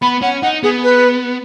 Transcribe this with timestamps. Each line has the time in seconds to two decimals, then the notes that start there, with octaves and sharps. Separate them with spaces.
0.02 B3 B5
0.22 C#4 F#5
0.42 D#4 F#5
0.63 B3 G#4
0.83 B4